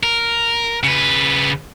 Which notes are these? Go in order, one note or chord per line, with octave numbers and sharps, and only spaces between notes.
A#4
C#3 B4